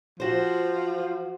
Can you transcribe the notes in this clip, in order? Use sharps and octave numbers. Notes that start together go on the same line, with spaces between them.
F3 F#4 C5